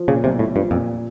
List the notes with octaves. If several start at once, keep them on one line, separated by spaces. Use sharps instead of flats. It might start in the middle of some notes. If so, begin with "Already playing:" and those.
Already playing: F3
A#2 C#3
B1 C3
A2 A3
G2 F3
F2 A#2